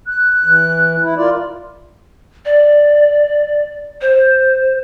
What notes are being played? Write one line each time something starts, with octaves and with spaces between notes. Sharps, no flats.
F#6
E3
E4
F4 A#4 D5
D5
C5